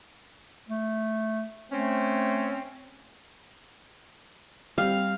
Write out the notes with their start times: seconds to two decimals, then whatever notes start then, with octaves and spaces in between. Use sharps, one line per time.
0.68 A3
1.72 A3 C4 C#4
4.78 G3 C4 F5